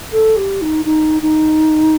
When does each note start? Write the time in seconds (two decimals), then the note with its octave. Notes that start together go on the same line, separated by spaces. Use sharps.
0.12 A4
0.36 G4
0.61 D#4
0.85 D#4
1.22 D#4